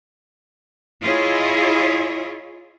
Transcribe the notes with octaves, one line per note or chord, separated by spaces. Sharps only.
E4 F4 G#4 C#5 D#5